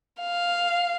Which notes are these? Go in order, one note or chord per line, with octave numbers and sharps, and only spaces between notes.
F5